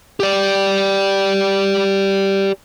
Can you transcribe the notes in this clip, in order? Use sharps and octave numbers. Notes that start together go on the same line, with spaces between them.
G4 D5